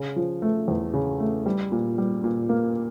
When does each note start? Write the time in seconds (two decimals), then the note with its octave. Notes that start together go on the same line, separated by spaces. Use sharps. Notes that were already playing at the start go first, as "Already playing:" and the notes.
Already playing: C#3
0.16 F3
0.42 A3
0.68 E2
0.94 C#3
1.20 A3
1.46 G3
1.72 A#2
1.98 G3
2.24 A#2
2.49 A#3